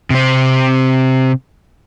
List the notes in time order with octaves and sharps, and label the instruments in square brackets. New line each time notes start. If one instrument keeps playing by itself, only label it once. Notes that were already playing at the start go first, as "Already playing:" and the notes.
[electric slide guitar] C3 C4